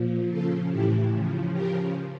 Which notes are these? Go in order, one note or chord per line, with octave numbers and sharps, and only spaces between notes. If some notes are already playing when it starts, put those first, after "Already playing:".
Already playing: A#2 F3
C#3 F3 F4 A4
A2 E3 E4 G4
C#3 F3
C#3 F3 G4 A#4